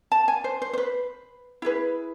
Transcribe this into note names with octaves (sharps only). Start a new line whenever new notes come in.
A5
G#5
C5
C5
C5
B4
E4 G#4 B4